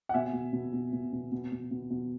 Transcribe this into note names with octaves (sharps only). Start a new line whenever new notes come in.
F#5
B2 E5 G#5
B2
B2
B2
B2
B2
B2
B2
B2
B2